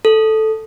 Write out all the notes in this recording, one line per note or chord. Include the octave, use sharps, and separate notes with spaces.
A4